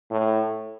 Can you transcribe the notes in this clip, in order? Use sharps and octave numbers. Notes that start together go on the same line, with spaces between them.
A2